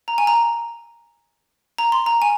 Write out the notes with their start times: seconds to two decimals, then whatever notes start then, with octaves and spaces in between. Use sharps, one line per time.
0.08 A#5
0.18 G#5
0.27 A#5
1.78 A#5
1.92 C6
2.06 A#5
2.22 G#5